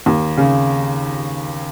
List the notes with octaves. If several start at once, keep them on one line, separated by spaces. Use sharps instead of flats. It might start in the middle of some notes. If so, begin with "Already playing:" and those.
D#2
C#3